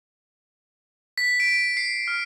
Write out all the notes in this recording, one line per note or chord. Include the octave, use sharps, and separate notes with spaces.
B6
D7
C7
F6